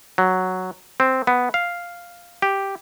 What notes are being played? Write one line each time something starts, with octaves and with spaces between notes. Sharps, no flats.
F#3
C4
B3
F5
G4